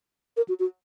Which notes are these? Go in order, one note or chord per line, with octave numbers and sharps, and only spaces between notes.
A#4
F#4
F#4